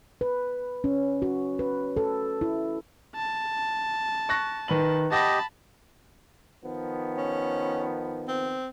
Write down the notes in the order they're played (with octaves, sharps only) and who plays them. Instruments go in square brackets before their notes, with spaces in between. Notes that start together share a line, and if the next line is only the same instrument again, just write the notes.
[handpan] B4
C#4
F#4
B4
A4
E4
[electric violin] A5
[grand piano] C#6 F#6 A#6
D#3 B4 F#7
[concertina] G4 D#5 [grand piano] F#5 A#6 [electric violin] A5 B5
[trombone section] D#3 F3 B3
[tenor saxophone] C#4
C4